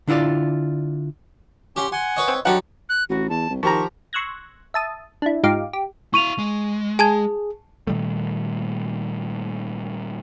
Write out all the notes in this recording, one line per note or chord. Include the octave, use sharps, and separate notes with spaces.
D3 D4 E4 F4 D5
C#4 G4 F#5 C6
F#5 G#5 C6
B4 C#5 D#5
C4
D3 F#3 D#4 G4 F#5
F#6
A1 F#4
E2 A5
C2
D#3 F3 G4 A#5 C#6
C6 C#6 E6 F#6 G#6 A#6
E5 A5 D#6
D4 E4
G#2 D#4 F4 G4 F5 D6
G4
E4 F5 C#6 D#7 F7
G#3
G#4 G#5 A5 G#6
A#2 D#3 G3 A3